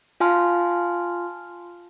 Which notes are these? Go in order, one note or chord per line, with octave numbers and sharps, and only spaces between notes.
F4 F5 G#5 A5 C6 F6